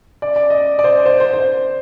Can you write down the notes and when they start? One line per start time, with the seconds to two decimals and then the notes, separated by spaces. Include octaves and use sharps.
0.22 D5
0.36 D5
0.50 D#5
0.79 D5
0.84 C5
1.06 C5
1.20 C5
1.34 C5